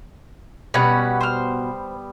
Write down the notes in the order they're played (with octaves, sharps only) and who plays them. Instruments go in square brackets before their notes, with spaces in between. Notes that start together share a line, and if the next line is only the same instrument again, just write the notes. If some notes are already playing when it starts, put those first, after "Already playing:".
[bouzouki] B2 [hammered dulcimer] G3 B3 [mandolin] C#4 F#4 B4
[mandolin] C5 F6